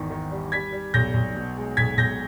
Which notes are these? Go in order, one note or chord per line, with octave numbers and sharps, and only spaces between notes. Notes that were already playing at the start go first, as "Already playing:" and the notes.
Already playing: G#1 E2 D#3
D#3
G3
G3 G#6 B6
G3
B1 G6 A#6
B1
B2
G#3
B1 G#6 B6
B1 G6 A#6